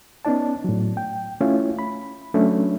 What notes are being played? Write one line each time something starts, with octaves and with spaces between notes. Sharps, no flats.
B3 C#4 D#4 D5 A5
A2 F#3
G5
A3 C#4 E4 F4
B5
F#3 A3 C#4 D4